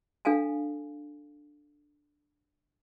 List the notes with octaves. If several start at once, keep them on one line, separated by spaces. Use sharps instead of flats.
D4 A4 F5 G#5 A5